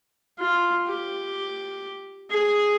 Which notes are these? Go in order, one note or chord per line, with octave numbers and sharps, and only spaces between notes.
F4
G4
G#4